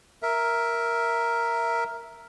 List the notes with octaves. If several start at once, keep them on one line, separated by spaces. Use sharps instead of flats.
A#4 E5